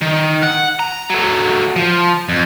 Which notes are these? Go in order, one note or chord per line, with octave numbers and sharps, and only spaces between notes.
D#3
F#5
A#5
F#3 A3
F3
F2